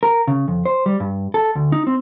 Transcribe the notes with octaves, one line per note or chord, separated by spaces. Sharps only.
A#4
C#3
F2
C5
G3
G2
A4
D2
D#4
C4